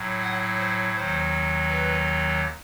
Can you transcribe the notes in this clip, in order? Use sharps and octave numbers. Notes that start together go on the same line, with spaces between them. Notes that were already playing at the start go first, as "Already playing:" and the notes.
Already playing: A2 F#3
F#5
C5
D#2 D#3 F#3 C5
B4